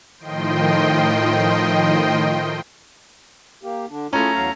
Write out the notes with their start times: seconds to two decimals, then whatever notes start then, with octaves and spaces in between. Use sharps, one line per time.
0.18 A2 D#3 F3 D#5 G5 C6
3.63 A#3 G4
3.90 D3 D4
4.13 A3 C#4 E4 F4 G#4 A#5
4.33 E2 F#3 F5